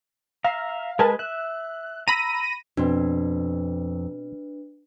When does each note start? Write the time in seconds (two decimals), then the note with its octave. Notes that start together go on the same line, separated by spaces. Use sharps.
0.44 E5 F5 A#5
0.99 G#3 A#4 B4 G#5 A5
1.19 E5 F#6
2.08 A#5 B5 E6 A#6 D#7
2.77 F2 B2 C4 D4 B4